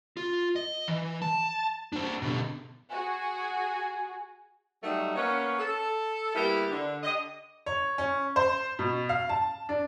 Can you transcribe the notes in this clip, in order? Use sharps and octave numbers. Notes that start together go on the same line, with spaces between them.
F4
D#5
E3
A5
D4 C5
B2 D3
F#4 G#4 G#5
F#3 G3 A3 D#4
A#3 B3 C#4
A4
G3 A#3 B3 E4 G4
D3
D3 G4 D#5
C#5
C#4
C5
B2
F5
A5
D4